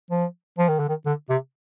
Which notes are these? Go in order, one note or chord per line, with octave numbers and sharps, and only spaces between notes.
F3
F3
D#3
D3
D#3
D3
C3